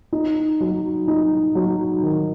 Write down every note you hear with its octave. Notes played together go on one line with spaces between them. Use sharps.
D#4
F#3
D#4
F#3
D#3